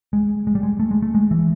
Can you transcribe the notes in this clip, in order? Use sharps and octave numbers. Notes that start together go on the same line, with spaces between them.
G#3
G#3
G3
G#3
A3
G#3
A3
G#3
E3